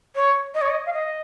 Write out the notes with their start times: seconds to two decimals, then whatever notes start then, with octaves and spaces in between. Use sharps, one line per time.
0.15 C#5
0.54 D#5
0.62 C#5
0.69 D#5
0.86 F5
0.93 D#5